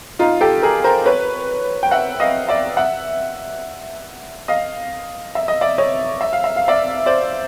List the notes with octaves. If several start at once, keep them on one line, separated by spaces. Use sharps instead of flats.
D#4 F4
G4 A4
G#4 A#4
A#4 C5
B4 C#5
G5
E5 F#5
D#5 F5
D5 E5
E5 F#5
D#5 F5
E5
D#5
D5 E5
C#5 D#5
E5
F5
E5
F5
D5 E5
C5 D5